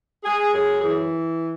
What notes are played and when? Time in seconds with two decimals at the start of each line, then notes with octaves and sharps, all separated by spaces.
0.24 G#3 G#4
0.53 F#2 G#4
0.81 E3 G#4